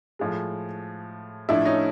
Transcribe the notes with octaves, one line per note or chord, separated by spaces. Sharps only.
A2 F3 G#3
A2 F3 A3 D4 E4
C#4 D#4